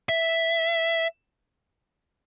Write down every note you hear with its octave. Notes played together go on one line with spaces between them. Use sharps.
E5